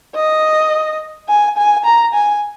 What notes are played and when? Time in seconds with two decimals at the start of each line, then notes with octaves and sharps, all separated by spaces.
0.16 D#5
1.28 G#5
1.57 G#5
1.85 A#5
2.14 G#5